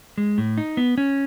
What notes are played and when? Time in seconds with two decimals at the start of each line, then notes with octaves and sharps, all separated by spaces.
0.18 G#3
0.38 A2
0.58 D#4
0.77 B3
0.98 C#4